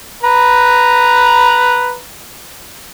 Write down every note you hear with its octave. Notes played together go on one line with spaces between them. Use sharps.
B4 A#5